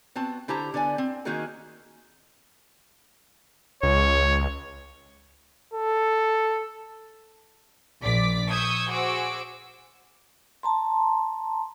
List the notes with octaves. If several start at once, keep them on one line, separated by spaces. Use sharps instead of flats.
B3 C4 F#4 A5
D3 E4 G4 C5 A5 A#5
D3 B3 D5 G#5
C4
D#3 A#3 D#4 F#4 G#4 A#4
C#2 C#5
A4
A#1 D5 D6 B6
C#6 D#6 E6 G6 G#6
F#4 G#4 C5 D6 E6
A5 A#5 C6